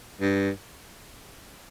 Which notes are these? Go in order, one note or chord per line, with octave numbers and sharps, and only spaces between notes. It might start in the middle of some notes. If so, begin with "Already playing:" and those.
G2